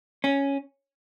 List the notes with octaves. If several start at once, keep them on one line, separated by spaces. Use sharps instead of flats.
C#4